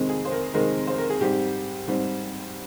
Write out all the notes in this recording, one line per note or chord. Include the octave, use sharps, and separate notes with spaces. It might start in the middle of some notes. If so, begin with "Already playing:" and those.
Already playing: F2 C3 D#3 G#3 C4
G#4
C5
A#4
F2 C3 D#3 G#3 C4 A#4
C5
A#4
G#4
G#2 G3 C4 G4
G#2 G3 C4